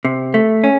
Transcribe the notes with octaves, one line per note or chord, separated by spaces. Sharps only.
C3
A3
C#4